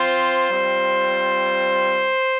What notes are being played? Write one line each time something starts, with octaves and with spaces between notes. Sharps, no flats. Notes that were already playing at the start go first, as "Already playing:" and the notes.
Already playing: C4 F4 C5
G3 C4 F4